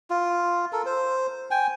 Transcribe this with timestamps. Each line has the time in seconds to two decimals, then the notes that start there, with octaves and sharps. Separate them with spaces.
0.10 F4
0.72 A4 A#4
0.86 C5
1.51 G5 G#5